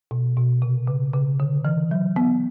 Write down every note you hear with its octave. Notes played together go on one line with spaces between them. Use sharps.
B2
B2
C3
C#3
C#3
D3
E3
F#3
B3